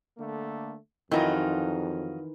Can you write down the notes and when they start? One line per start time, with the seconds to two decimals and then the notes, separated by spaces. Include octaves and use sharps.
0.18 D3 A3 A#3
1.11 F2 D#3 E3 F#3 D#4 F4